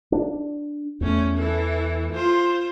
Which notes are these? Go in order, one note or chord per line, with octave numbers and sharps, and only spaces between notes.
D4
E2 A3 C#4
E3 A4
F4 C5